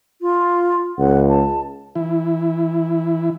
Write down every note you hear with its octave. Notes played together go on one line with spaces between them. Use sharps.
F4
C#2 F#5
A5
E3 E4